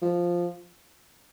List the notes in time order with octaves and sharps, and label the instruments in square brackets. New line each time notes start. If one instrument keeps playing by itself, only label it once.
[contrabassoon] F3